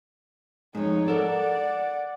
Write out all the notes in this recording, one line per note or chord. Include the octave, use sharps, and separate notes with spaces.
F2 G#2 D#4 C#5
A4 A#4 D5 F#5